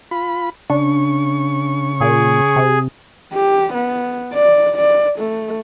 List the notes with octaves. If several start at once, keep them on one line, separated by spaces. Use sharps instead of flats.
F4 B5
C#3 D4 C#6
A#2 G#4
C3
G4
B3
D5
D5
A3